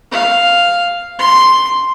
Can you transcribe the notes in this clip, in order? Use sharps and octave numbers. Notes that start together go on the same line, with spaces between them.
F5
C6